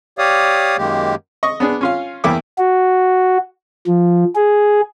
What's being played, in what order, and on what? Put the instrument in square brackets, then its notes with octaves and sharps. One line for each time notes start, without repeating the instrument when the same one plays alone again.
[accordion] G4 C#5 D5 F5 D#6
F#2 D#3 G#3 A#3 G4
[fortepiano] D#5 C#6
B3 D4 G#4
C#4 F4 F5
E2 A#3 E4 E5 G5 D6
[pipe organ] F#4
F3
G#4